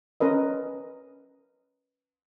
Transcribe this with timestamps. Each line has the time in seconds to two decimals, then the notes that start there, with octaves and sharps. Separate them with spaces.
0.20 C#4 A#4 B4 D#5